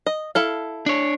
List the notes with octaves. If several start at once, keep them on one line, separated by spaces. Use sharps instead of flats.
D#5
E4 A4 F5
D4 C#5